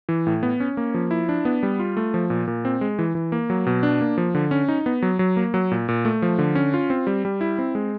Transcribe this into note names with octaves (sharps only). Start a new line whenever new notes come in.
E3
A2
B3
C#4
A#3
F3
E4
D4
B3
G3
F4
A3
F3
A#2
A#2
C4
G#3
E3
E3
A#3
F#3
B2
D4
A#3
F3
D3
C#4
D#4
B3
F#3
F#3
A#3
F#3
A#2
A#2
A3
F3
D3
C#4
F4
C4
G3
G3
E4
C4
G#3